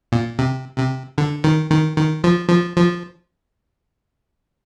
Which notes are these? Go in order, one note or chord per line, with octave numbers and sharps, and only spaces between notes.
A#2
C3
C3
D3
D#3
D#3
D#3
F3
F3
F3